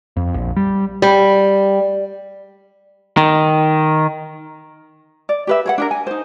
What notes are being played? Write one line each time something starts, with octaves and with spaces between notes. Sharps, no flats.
F2
A#1
G3
G3
D#3
D5
G4 B4 E5
G#4 C#5 F#5
D4 G4 A#4
G#5
D#4 C5